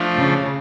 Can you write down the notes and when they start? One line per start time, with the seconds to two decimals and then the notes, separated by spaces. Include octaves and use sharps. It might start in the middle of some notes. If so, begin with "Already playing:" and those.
Already playing: F3 A3 D4 F4
0.15 C#3